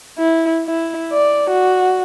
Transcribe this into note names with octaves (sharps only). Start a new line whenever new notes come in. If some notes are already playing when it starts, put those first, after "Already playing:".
E4
E4
D5
F#4